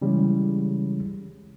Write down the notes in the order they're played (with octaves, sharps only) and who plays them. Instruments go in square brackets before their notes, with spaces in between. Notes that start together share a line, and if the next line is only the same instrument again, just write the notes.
[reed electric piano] C#3 E3 G3 G#3 C#4